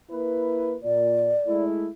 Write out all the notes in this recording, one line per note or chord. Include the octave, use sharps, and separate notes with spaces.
A#3 E4 B4
A#2 D5
G#3 A3 E4